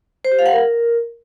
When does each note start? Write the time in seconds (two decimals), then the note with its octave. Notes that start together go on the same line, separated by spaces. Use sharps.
0.25 C5
0.32 G4
0.39 F5
0.46 F#5
0.53 A#4